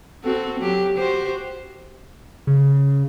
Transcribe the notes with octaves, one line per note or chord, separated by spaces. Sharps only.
C4 F#4 A4
F#3 G4
F#4 G4 C5
C#3